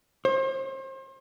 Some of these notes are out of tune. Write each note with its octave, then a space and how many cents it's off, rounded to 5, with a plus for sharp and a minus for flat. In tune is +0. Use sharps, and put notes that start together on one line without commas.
C5 +35